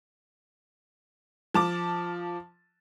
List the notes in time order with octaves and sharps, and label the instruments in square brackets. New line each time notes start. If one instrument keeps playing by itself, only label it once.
[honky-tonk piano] F3 A5 D6